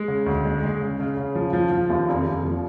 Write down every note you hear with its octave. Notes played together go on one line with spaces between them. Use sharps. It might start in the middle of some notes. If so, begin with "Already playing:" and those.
Already playing: G#3
C#3
D2
G#3
G#3
C#3
C#3
C#3
F3
F3
F3
D#2
F1
F1
F3